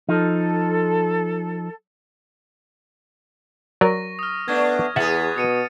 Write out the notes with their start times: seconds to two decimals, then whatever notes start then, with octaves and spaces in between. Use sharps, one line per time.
0.09 F3 D#4 A4
3.81 F#3 A#4 D5 C#6 A#6
4.19 D#6 F6
4.48 A3 B3 D4 G#6
4.96 E2 B3 G#4 E5 F#5 A6
5.36 B2 D#6 C#7 D#7